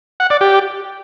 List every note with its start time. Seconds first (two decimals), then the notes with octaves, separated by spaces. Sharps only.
0.20 F#5
0.30 D5
0.41 G4